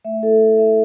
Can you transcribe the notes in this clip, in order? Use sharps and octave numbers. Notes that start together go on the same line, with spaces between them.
A3 E5
E4 A4
E4
E4 E5